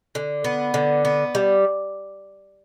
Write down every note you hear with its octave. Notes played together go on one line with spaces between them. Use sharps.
D3
B3
D3
B3
G3